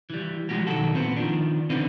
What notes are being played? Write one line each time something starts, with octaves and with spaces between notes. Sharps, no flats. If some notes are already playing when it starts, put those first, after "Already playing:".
E3 G3
F3 G#3 A#3 C#4 F#4 G4
B1 D#3 F#3 F#4 A4
A#2 B3 C4
D#3 F3 D4
D3 E3 B3 C4 D4 D#4